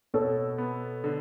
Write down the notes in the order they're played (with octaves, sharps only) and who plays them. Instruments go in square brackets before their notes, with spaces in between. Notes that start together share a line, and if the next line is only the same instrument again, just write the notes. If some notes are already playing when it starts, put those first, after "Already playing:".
[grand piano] B2 [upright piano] A4 C#5
[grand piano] B3
D3